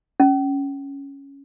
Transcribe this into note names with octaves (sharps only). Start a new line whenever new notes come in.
C#4